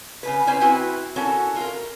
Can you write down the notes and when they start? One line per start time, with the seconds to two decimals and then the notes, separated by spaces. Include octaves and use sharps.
0.23 C#3 F3 B4
0.47 C#4 E4 B4 C5 G#5
0.61 C4 E4 F#4 B4
1.16 C#4 E4 F#4 A4 A#4
1.56 F4 A#4